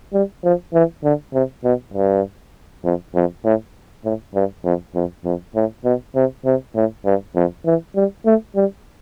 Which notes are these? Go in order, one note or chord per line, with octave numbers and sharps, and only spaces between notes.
G3
F3
E3
D3
C3
B2
G2
F2
F2
A2
A2
G2
F2
F2
F2
A2
B2
C3
C3
A2
G2
F2
E3
G3
A3
G3